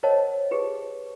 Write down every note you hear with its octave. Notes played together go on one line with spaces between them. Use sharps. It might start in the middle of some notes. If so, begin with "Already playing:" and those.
A#4 C5 C#5 D#5 F#5 A5
G4 G#4 B4